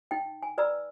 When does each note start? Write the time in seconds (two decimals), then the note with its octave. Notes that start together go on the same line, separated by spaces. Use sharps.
0.11 D#4 G5
0.43 G#5
0.58 B4 D5 A#5 B5 E6